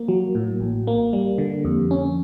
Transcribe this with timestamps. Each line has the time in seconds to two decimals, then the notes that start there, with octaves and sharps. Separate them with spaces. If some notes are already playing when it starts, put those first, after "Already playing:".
Already playing: A#3
0.08 F#3
0.35 A2
0.60 A1
0.87 A#3
1.13 G3
1.38 D3
1.65 F2
1.91 C#4